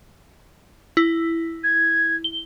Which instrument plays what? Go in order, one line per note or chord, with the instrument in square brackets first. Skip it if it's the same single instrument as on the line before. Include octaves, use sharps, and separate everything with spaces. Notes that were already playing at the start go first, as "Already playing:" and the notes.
[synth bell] E4
[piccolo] G#6
[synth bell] G7